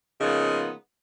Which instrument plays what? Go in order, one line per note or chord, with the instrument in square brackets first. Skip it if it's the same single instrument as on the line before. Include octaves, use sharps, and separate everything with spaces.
[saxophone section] C#3 F3 G#3 A#3 B3 D#4